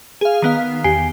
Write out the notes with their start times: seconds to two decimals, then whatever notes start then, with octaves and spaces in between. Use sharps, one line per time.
0.21 G#4 F5
0.42 D#3 B3 F5
0.84 E2 G4 G#5 C7